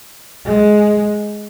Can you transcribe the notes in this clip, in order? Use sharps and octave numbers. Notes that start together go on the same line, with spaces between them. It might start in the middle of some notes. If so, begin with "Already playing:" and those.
G#3